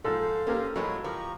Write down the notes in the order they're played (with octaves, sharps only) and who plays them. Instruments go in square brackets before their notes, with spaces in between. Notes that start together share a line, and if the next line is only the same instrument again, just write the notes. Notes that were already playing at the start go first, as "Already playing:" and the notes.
[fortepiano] G#2 F3 [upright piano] A4 [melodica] C5 F5
[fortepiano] A#3 G4 A#4 [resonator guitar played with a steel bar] C#4
[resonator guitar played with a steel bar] A2 G#3 B3 [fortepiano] F#3 [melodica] F4 B4 C#5
[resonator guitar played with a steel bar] F3 [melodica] G4 A#5 C#6 [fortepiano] A#4